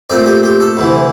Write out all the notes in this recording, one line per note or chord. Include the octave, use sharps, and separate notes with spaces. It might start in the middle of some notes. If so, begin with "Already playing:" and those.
A#2 A3 C4 D5
G4
G4
A4
D2 C3 E3